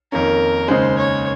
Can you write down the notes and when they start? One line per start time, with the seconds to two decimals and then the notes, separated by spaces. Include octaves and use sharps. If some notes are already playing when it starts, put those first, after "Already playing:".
0.12 F2 D#3 A#3 C#4 A#4
0.68 D#2 C#3 G#3 C5
0.98 C#5